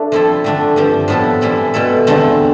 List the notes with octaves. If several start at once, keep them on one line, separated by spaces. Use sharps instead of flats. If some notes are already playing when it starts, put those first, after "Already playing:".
Already playing: A3 D4
F3 C4 E4 A4
D3 A3 D4
G2 F3 C4 G4
A2 F3 B3 E4 A4
E3 G3 C4 E4 A4
B2 A3 E4 A4
E2 D3 A3 C4